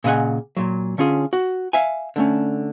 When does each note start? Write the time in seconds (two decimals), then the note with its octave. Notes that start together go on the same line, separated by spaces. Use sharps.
0.04 A#2 C#3 D#5 F#5 G#5
0.57 A#2 F#3
0.98 D3 C#4 F4 G#4
1.33 F#4
1.73 E5 F5 G#5
2.16 D3 A3 C#4